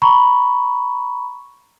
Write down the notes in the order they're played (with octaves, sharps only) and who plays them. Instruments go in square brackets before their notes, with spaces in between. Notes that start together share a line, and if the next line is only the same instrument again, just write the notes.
[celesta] A#5 B5 C#6